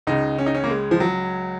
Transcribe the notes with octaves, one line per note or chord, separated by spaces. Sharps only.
C#2 C#3 D#4
C#4
D#4
C#4
A#3
G#3
F3
F#3